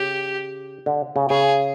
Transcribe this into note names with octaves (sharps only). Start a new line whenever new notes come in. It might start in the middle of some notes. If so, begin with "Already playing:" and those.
Already playing: C#3 G4
D3
C#3
C#3 G#4